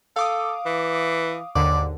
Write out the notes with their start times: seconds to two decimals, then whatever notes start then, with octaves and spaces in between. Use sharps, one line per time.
0.16 A4 F5 D6 D#6
0.66 E3
1.56 D#2 G#2 D3 D5